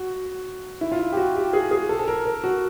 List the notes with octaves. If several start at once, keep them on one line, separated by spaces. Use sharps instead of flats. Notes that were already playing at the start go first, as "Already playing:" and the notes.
Already playing: F#4
E4
F4
E4
G4
F#4
G4
G#4
G#4
A4
A4
A#4
A#4
F#4